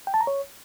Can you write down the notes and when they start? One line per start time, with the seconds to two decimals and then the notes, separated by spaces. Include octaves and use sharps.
0.07 G5
0.14 A5
0.21 A#5
0.27 C#5